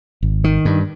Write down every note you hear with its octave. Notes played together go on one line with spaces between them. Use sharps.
G#1
D#3
G2